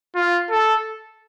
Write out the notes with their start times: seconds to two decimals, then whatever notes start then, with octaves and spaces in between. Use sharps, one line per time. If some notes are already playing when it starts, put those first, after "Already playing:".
0.15 F4
0.51 A4